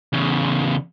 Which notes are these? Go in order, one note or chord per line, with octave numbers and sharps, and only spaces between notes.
E2 C#3